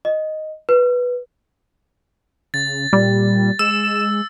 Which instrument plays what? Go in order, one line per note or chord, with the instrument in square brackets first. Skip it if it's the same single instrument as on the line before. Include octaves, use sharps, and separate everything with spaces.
[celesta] D#5
B4
[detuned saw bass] C#3 [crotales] A6
[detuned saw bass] A#2 [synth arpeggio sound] G3
[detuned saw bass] G#3 [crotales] E6 [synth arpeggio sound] E7